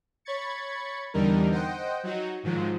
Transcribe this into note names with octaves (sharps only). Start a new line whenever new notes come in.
C#5 B5 C#6 G#6 A6 C#7
E2 D3 G3 D#4 A#4
C5 D#5 F#5 G5
F#3 D#4 F#4
G#2 D#3 F3 F#3 G#3